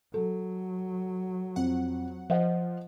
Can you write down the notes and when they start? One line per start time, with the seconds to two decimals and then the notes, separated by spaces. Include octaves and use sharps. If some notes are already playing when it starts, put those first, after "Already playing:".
0.14 F#3 A4
1.56 F2 F#5
2.30 F3 C5 D#5 F#5